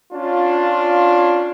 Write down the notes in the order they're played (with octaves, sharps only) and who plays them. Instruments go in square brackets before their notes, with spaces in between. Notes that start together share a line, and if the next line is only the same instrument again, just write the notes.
[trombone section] C#4 D4 F4